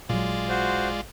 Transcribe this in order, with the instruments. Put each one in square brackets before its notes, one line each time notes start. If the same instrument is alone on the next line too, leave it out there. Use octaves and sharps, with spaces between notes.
[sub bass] A1 [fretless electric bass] A#2 F#3 [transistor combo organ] G#3 F4 D5
[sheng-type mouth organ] F#4 C5